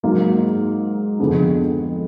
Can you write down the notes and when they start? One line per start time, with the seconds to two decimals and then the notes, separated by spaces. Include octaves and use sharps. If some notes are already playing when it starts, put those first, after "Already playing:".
0.03 G#2 F#3 A#3
1.19 F2 D3 G#3 B3 D4